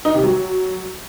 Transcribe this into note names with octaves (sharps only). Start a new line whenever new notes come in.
D#4
C3
F#3